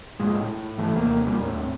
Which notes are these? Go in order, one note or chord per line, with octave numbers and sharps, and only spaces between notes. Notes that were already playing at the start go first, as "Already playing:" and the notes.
G2 A#2 G#3
A2
G#2 E3 A3
D#2 C3 A#3
D#2 A#2 G3 A#3
D#2 A2 C4